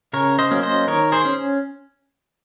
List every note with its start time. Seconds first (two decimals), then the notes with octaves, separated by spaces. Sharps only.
0.13 C#3 A#4 C#5
0.39 C5 D#5
0.51 F#3 A#3 C#4
0.63 C5 D#5
0.87 D#3 A#4 C#5
1.12 G#4 C5
1.25 C#4